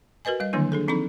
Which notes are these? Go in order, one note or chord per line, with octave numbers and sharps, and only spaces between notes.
F#4 A#4 B4 D#5 G#5
G3 D#5
D3 D#3 F#3 A#3 D4 E4
D4 G#4 A4
F3 C4 D#4 A4 B5